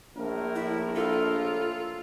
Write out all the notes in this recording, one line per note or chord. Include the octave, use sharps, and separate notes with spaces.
A#1 A2 A#4
E4
F4 A4